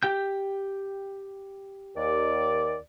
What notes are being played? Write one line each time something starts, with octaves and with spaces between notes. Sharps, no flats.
G4 G5 G6
D#2 D5